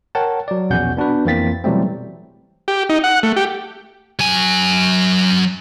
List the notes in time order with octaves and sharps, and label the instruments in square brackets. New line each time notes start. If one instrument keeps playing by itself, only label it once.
[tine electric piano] A#4 C#5 F#5 G5 A5
F#3 D5
A#1 E2 B2 C#4 F#5 G6
B3 D4 F#4 B4
F2 E3 A#3 C4 A6 B6
B2 E3 F#3 G3 A3 C4
[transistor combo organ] G4
D#4
F#5
A3
G4
[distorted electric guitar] F#3 G#5